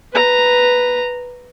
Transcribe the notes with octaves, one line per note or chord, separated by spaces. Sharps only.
B4 A#5